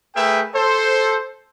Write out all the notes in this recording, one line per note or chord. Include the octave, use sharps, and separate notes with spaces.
A3 G#4 A#4 B4 E5 G5
A4 C5